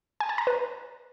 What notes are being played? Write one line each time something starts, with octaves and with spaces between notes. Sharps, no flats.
G#5
A5
A#5
B4